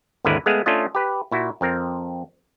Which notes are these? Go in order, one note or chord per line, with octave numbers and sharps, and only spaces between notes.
G#1 D#2 D3 E4 A#4 B4
G#3 A3 B3 G#4 F5
A3 C#4 D4 F4 D#5
G4 B4
A#2 E4 F#4
F2 C4 A#4